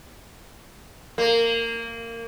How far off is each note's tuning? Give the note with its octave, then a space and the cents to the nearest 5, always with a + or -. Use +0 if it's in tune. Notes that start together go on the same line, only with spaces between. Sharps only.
A#3 -20